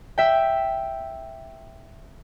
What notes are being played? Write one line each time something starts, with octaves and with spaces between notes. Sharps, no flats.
E5 G5